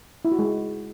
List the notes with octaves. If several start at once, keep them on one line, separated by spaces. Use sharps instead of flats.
E4
F#4
G#3